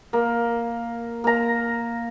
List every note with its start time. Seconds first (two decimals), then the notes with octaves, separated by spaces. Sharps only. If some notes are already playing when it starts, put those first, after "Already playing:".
0.13 A#3
1.24 A#3 A#5